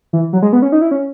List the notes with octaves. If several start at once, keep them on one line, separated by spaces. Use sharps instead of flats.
E3
F#3
G#3
B3
C#4
D#4
E4
C#4